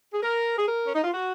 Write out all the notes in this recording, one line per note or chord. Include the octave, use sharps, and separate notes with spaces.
G#4
A#4
G#4
A#4
C#4
D#4
F4
F#4